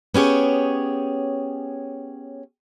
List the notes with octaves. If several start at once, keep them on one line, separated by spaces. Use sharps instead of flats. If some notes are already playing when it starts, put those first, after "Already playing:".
B3 C#4 G4 G#4 C#5